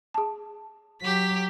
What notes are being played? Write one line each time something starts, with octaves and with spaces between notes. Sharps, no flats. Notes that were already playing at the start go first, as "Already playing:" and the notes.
G#4 A5
F#3 G4 B6